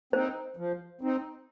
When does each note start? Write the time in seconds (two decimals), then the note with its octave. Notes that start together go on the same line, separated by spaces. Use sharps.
0.13 C4 D#4 C5
0.57 F3
1.01 C4 D#4